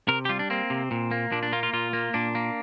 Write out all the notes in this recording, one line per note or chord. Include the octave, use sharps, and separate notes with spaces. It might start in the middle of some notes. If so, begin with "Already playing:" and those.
C3 A#4
G4
G3 F4
D4
A#3 C4
C3
A#2
A#3
A#2 D4
D4
A#3 F4
F4
A#2 F4
A#3
A#2 D4
A#3